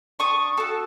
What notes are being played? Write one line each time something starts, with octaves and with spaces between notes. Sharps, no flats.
D4 C#6 D#6
F#4 A4